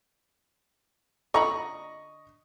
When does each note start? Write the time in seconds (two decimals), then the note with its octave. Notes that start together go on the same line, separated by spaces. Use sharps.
1.34 D3 D#5 A#5 B5 C#6